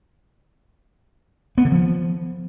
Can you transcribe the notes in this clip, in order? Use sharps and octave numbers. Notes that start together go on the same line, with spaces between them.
B3
D3
F3